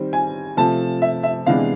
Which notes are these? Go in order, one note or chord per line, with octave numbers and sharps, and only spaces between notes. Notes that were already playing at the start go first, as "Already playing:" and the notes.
Already playing: D#3 G3 C4
G#5
C3 F3 A3 A5
E5
E5
C3 E3 G#3 B3 D4 F5